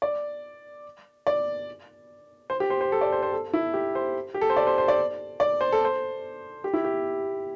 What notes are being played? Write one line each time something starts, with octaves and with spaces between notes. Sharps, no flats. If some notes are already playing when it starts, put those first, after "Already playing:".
D5
D5
C5
G4
C5
C5
A4
D5
C5
C5
A4
E4
G4
C5
G4
A4
C5
D5
C5
C5
D5
D5
C5
A4
C5
G4
E4
G4